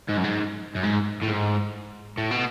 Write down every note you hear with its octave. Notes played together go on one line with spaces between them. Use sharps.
G#2
F#2
G#2
F#2
G#2
A2
G#2
A2
B2